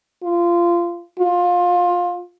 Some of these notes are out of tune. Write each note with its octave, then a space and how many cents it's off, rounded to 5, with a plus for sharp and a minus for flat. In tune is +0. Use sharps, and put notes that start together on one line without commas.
F4 -20
F4 +20